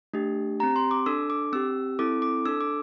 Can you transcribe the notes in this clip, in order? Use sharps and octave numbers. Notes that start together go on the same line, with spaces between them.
A3 D4 G4
C4 G4 A#5
C6
D6
D4 A4 E6
D6
C4 G4 E6
C4 E4 A4 D6
D6
D4 A4 E6
D6